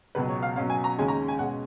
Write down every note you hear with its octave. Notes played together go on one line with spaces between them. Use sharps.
C#2 B2 F#3 B4
C#5
F5
B2 F#3 C#4 F5
G#5
A#5
D#2 C#3 G#3 C#4 G#5
A#5
G#5
B2 G#3 C#4 F#5